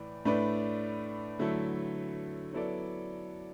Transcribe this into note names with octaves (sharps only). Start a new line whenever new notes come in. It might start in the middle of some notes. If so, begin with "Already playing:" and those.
Already playing: A2 E3 D5
A2 A3 D4 B4 D5
D3 F#3 A3 E4 A4
F#3 B3 E4 A4 D5